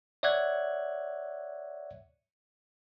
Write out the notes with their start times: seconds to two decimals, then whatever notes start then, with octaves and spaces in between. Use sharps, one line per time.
0.23 C#5 D5 E5 F#5 F#6 G#6